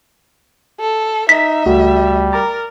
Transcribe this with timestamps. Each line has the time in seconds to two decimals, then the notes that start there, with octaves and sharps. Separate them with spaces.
0.80 A4
1.29 D#4 E5 B6
1.66 C#2 G3 A3 F#4
2.33 A#4 A#5 D6 A6